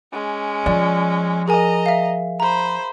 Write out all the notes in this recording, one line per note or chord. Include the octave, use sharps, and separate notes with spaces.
G#3 C#4
F3 D5
G#4 A#4 D#5 G#5 A#5
E5 F5
C5 A#5 B5